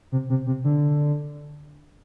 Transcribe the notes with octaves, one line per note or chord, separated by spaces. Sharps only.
C3
C3
C3
D3